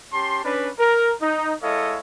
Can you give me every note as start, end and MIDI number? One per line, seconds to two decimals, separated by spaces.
0.13 0.42 61
0.13 0.42 67
0.13 0.42 81
0.13 0.42 84
0.45 0.70 61
0.45 0.70 62
0.45 0.70 71
0.79 1.13 70
1.22 1.54 63
1.63 1.99 56
1.63 1.99 64
1.63 1.99 69
1.63 1.99 73
1.63 1.99 75
1.63 1.99 77